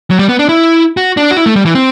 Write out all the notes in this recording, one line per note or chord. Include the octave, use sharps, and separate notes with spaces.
F#3
G3
B3
D4
E4
F#4
D4
F#4
E4
A3
G3
E3
C4